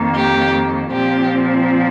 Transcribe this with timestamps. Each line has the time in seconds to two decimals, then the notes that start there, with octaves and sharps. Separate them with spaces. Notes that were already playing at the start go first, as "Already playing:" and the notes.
Already playing: F2 D#3 A#3
0.13 G4
0.91 A#2 F3 C4 G4